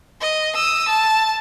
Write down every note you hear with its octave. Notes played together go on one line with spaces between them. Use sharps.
D#5
D#6 E6
A5